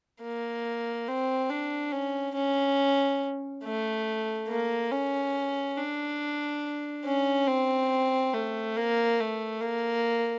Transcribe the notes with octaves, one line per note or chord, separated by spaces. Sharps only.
A#3
C4
D4
C#4
C#4
A3
A#3
C#4
D4
C#4
C4
A3
A#3
A3
A#3